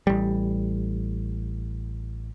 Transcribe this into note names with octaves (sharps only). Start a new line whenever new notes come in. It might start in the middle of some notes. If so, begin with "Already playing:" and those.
A1 G3